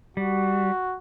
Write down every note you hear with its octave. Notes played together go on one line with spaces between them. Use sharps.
G3 F#4